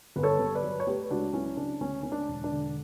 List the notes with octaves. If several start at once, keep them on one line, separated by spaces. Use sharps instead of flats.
G1 B4
A4 C#5
G1
B4 D5
F#3
C#5
A3 G4 B4
C#2 D4 F#4
F#3 C#4 E4
C#3 D4
D2 C#4
D3 C#4
D4
E1
D4
D3